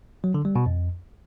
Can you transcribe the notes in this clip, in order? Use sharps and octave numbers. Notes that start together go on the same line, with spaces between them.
F#3
D3
G3
B2
F2